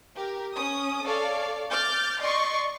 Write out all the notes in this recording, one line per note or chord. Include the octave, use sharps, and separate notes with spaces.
G4 A#4
C#4 D#6
A4 C#5 D5 F5
D6 F6 G6 A6
D5 D#5 C6 C#6